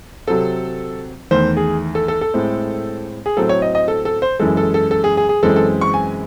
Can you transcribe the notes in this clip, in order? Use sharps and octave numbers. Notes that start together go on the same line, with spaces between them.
C3 F#3 C4 A4
E2 D#3 A3 C5
G#4
A4
A4
A4
A2 G#3 C4
G#4
A2 F#3 C4 A4
C#5
D#5
D#5
A4
A4
C5
F#2 E3 G#3 A4
A4
A4
A4
G#4
G#4
G#4
F#2 E3 G#3 C4 A4
A4
C#6
G#5